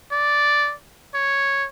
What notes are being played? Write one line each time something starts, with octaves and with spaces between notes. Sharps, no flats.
D5
C#5